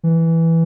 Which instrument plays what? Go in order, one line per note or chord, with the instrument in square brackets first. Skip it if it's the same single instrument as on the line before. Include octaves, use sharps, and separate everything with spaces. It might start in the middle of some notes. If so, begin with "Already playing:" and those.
[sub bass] E3